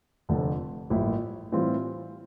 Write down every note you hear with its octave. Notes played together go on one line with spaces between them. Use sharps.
F1 F2 D3 F3 A3
A1 G2 F3 A#3 E4
A2 E3 G3 C4 F4